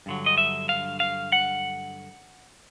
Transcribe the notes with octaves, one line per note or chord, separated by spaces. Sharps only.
G2 D3 F#3
D#5
E5
F5
F5
F#5